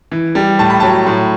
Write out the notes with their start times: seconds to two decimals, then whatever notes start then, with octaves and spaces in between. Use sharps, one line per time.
0.12 E3
0.35 G3
0.59 A2 A5
0.70 B5
0.80 F#3 A5
1.07 A2